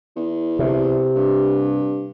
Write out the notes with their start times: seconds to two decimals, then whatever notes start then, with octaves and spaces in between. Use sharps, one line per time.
0.16 E2
0.59 C3
1.15 G2